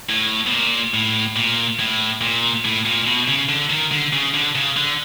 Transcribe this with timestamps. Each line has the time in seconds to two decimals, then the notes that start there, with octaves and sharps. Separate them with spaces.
0.09 A2
0.47 B2
0.52 A#2
0.94 A2
1.36 A#2
1.80 A2
2.21 A#2
2.65 A2
2.86 A#2
3.07 B2
3.28 C#3
3.49 D3
3.70 D#3
3.92 D3
4.13 C#3
4.34 D3
4.55 C#3
4.77 D3